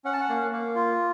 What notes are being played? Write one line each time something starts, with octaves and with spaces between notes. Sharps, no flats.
C#4 F#5
A5
F#5
A#3
A#3
F4